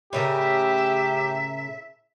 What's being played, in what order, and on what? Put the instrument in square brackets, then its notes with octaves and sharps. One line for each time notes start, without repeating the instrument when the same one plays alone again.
[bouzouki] A2 C#3 A#4 [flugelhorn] G4 [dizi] E5